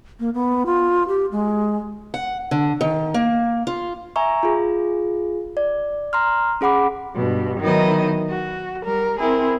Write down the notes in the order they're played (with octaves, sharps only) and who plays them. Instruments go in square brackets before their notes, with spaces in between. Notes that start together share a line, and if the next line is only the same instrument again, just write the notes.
[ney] A#3
B3
F4
G4
G#3
[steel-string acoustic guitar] F#5
D3
D#3
A#3
F4
[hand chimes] E5 G#5 A#5 C#6
F4 G#4
D5
A#5 C6 F6
C#4 G#4 F#5 B5 D6
[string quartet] G2 B2
D#3 F#3 B3 D#4 E4 D#5
F#4
G3 A#4
C4 E4 G#4 A#4